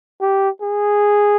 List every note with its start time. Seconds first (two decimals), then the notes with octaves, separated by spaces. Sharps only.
0.21 G4
0.62 G#4